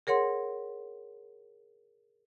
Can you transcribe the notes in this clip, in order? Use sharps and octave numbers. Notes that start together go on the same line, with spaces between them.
G#4 A#4 C#5 F#5 C6